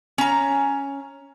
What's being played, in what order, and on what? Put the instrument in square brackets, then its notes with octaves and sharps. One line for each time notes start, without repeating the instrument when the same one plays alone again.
[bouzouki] C#4 A#5